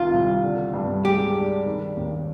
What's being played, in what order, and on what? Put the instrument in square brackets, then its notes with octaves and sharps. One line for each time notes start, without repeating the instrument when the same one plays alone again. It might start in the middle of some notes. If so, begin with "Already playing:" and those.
Already playing: [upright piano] C2 C3 D#3 [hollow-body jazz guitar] F4
[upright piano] C2
D3
G2
[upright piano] G#3 [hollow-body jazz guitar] G4
[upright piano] D4
D#3
D#2